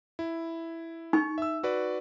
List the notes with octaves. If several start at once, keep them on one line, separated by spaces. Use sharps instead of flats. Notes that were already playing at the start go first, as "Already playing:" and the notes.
E4
D#4 C#6
E5 E6
F#4 B4 D5